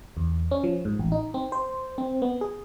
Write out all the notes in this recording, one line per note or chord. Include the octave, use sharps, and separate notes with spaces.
E2
C#4
F3
G#2
A1
D#4
C4
C5
C4
B3
G#4